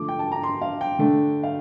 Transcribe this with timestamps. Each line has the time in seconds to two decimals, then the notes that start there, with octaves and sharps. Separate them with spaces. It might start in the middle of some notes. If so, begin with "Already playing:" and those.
Already playing: D3 F3 A3 D6
0.08 G5
0.19 A5
0.32 A#5
0.43 C6
0.61 F5
0.81 G5
0.99 D3 A3 D4
1.43 F5